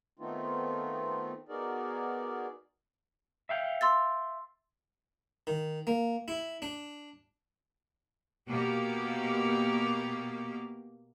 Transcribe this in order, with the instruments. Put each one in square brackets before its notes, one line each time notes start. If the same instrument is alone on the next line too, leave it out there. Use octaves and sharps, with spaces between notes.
[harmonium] D#3 A3 B3 C4 D#4 F4
B3 D#4 F#4 G#4 A#4 D5
[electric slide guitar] E5 F5 G5
[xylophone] C6 E6 A6
[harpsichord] D#3
A#3
E4
D4
[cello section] B2 A#3 G4